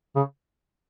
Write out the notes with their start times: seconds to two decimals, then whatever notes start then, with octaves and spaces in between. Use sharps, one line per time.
0.15 C#3